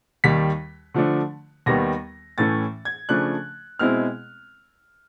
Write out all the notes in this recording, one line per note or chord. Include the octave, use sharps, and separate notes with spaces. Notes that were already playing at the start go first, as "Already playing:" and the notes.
D#2 D#3 G3 B6
D3 F3 A3 D4
D#2 D#3 G3 B3 A#6
A2 E3 A3 C#4 A6
G#6
C#3 F3 A3 D4 F#6
B2 G#3 C4 E4 F6